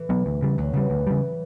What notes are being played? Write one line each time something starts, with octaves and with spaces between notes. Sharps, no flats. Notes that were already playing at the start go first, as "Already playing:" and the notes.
Already playing: A2 E3
B2 F#3 B3
D2
C#3 G3
D2 F#3
C#3 E3 G3
D2
C#3 G3